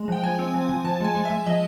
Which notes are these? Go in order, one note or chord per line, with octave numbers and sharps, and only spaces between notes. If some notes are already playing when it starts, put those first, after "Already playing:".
Already playing: G#3
F3 G5
F3 G#5
C4
F3
F3
F3 A5
G#3 G#5
G#3
G#3 E5
F3 D#5